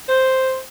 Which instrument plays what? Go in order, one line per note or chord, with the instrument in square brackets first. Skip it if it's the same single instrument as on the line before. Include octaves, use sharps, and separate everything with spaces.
[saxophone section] C5